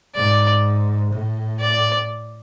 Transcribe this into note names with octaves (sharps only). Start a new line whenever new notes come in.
G#2 D5
A2
D5